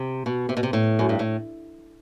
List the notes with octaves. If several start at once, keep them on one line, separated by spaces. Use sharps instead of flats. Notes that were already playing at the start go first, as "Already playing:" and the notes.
Already playing: C3
B2
C3
B2
C3
A2
F#2
G2
A2